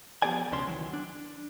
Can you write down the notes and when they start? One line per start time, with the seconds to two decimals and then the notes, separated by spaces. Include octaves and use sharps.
0.22 F3 B3 G4 G#4 D5 G#5
0.52 C#2 B2 C#4 D4 C6
0.67 D#3 E3 F#3
0.93 D4